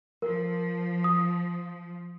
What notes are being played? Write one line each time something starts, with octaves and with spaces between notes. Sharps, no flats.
F3 A#4
D#6